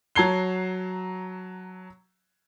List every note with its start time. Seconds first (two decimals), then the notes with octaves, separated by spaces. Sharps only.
0.16 F#3 A5 A#5 G#6 C7 G7